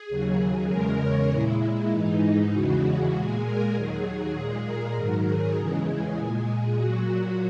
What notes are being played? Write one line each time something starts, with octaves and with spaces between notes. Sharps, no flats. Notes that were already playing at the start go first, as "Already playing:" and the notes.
Already playing: G#4
D#2 C#3 F#3
E2 C#3 G#3 A#4
C#5
A#2 G#3 E4
G#2 E3 G#3 D#4
E2 C#3 E3 G#3 F#4
A#2 G#3 G#4
A#4
D#2 D#3 F#3 G#4
A#2 G#3 G#4
A#4
G#2 D#3 F#3 A#4
G#4
E2 C#3 E3 G#3
A#2 G#3
A#2 F#3 F#4